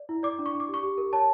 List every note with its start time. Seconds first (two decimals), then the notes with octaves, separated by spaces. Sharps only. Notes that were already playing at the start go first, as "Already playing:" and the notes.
Already playing: D5
0.09 E4
0.23 D5 D6
0.39 D4
0.46 C#6
0.53 D4
0.60 D6
0.68 G4
0.74 C#6
0.83 G4
0.98 A#4
1.13 C#5 A5